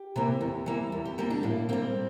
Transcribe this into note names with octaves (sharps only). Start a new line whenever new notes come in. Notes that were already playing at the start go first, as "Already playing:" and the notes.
Already playing: G4
C3 E3 A#3
E2
E3 G3 A#3
E2
G4
E3 G3 A#3 G4
D4
A2 A#3
G3 A#3 C4